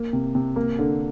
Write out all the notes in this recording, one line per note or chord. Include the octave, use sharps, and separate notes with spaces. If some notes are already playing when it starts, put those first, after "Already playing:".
Already playing: A#3
C3
C3
A#3
D3